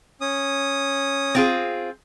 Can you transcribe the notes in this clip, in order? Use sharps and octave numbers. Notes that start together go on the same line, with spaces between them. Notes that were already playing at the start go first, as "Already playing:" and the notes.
C#4 D#6
C4 F4 G#4